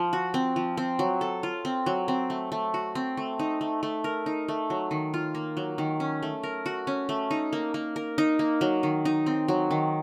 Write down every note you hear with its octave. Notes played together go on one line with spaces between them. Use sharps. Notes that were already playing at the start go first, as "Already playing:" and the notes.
Already playing: F3
F#4
C4
F3
C4
F#3
A4
F4
C4
F#3
C4
A3
A3
F#4
C4
A3
D#4
A3
A3
A#4
D#4
A3
F#3
D#3
F4
A#3
F#3
D#3
C#4
A3
A#4
F#4
C#4
A3
D#4
A#3
A#3
A#4
D#4
A#3
F#3
D#3
D#4
C4
F#3
D#3